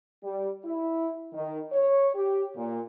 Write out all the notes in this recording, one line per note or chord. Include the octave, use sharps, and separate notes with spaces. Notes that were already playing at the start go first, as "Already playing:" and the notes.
G3
E4
D#3
C#5
G4
A#2